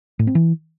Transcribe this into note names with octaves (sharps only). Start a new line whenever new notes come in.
A2
C4
E3